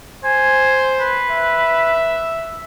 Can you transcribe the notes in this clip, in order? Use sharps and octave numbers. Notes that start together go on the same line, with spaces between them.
C5 G#5
B4
E5